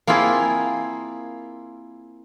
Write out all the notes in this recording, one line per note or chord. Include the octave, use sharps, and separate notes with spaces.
A#3 C4 E4 F4 G#4